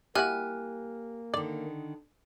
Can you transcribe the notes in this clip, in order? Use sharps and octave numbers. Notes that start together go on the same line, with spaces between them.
G3 A#3 E4 F#4 G4 G#5 F6 F#6
D3 D#3 D5